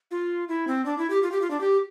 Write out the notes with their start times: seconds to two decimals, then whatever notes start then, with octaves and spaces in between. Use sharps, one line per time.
0.11 F4
0.49 E4
0.68 C4
0.86 D4
0.98 E4
1.10 G4
1.23 F4
1.32 G4
1.42 F4
1.51 D4
1.61 G4